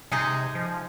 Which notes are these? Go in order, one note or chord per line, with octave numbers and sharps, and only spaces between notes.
C3 G#3 D#4 D#5
F3